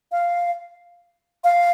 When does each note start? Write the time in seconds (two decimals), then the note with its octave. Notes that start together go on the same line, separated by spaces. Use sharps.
0.12 F5
1.44 F5